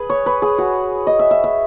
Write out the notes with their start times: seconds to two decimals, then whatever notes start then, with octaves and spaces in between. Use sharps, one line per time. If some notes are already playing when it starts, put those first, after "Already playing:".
Already playing: G#4 B4
0.10 C#5
0.26 B4
0.42 G#4
0.58 F#4
1.07 D#5
1.19 E5
1.31 E5
1.44 E5